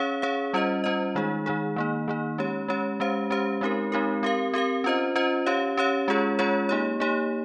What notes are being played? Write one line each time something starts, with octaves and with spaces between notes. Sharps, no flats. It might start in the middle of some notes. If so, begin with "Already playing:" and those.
Already playing: C#4 G#4 C#5 F5
C#4 G#4 C#5 F5
G3 C#4 F4 C5 D#5
G3 C#4 F4 C5 D#5
D#3 G#3 D#4 G#4
D#3 G#3 D#4 G#4
D#3 A#3 D#4
D#3 A#3 D#4
G#3 C#4 G4 C#5
G#3 C#4 G4 C#5
G#3 C#4 G4 C5 F5
G#3 C#4 G4 C5 F5
G#3 C4 D#4 G4 A#4
G#3 C4 D#4 G4 A#4
C4 G4 A#4 F5
C4 G4 A#4 F5
C#4 F4 C5 D#5
C#4 F4 C5 D#5
C#4 G4 C#5 F5
C#4 G4 C#5 F5
G#3 C#4 F4 G#4 C#5
G#3 C#4 F4 G#4 C#5
A#3 D#4 G4 C#5
A#3 D#4 G4 C#5